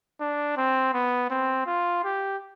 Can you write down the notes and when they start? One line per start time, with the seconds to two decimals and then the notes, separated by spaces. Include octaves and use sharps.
0.20 D4
0.57 C4
0.93 B3
1.30 C4
1.66 F4
2.04 G4